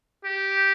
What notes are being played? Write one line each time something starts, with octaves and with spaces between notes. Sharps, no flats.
G4